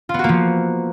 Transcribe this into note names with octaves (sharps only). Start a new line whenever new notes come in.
F3 A#3 B3 F4 F#4